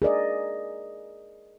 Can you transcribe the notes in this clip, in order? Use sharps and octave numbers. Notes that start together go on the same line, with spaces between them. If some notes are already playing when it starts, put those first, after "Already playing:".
G#4 A#4 D5 D#5